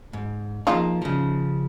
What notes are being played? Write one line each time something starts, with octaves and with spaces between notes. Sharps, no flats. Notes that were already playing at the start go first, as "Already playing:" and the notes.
G#2
F3 A#3 D#4 F4 G#4
C#3 F3